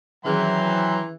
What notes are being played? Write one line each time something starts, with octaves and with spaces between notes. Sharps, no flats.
D#3 E3 F#3 C#4 G#4 G5 A#5 C6